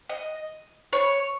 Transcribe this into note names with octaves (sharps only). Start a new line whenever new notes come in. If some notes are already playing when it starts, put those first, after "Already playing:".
D#5
C#5